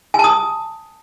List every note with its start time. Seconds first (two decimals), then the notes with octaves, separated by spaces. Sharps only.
0.14 G#5
0.19 A5
0.24 D#6